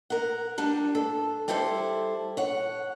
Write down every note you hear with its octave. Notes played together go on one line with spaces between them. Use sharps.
A#4 F#5
G3 D4 G4
A4
G3 E4 G4 A4 C5
C#5 F#5